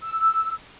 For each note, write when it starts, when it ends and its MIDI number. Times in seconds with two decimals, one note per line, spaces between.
0.02 0.52 88